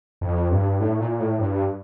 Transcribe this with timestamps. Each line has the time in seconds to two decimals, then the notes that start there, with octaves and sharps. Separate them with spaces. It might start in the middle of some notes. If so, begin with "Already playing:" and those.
0.21 F2
0.51 G2
0.80 A2
1.00 A#2
1.20 A2
1.39 G2